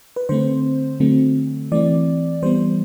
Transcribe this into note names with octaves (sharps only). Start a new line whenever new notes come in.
B4
D3 A3 C4 C5
D3 F#3 A3 C4
E3 A3 C4 D5
E3 G3 B3 C5